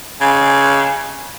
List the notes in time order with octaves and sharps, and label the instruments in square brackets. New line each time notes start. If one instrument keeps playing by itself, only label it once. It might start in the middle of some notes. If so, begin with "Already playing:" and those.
[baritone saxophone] C#3